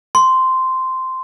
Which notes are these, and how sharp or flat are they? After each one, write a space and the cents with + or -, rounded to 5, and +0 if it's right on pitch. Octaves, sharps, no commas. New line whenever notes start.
C6 -10